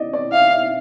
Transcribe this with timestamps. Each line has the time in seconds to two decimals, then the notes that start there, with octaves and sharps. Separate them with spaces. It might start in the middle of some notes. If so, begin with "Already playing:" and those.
Already playing: D5 D#5
0.13 D5
0.32 E5 F5
0.52 E5